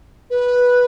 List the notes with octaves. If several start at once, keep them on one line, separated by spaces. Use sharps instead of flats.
B4